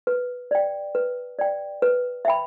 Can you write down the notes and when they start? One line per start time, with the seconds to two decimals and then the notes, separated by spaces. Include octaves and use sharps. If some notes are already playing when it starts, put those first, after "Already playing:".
0.07 B4
0.51 D5 G5
0.95 B4
1.39 D5 G5
1.82 B4
2.25 E5 G5 B5